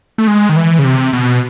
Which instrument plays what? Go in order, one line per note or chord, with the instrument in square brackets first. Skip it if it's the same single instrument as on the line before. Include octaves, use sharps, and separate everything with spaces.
[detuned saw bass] A3
G#3
D#3
E3
C#3
C3
B2